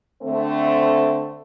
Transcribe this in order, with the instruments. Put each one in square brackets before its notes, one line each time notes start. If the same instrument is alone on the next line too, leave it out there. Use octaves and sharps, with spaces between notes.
[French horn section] D3 A3 C4